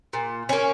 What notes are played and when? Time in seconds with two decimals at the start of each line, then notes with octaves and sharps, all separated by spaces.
0.13 A#2
0.49 A#3 C#4